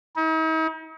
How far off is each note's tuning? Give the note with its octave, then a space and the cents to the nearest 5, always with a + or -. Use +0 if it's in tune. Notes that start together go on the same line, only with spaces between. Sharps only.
D#4 +45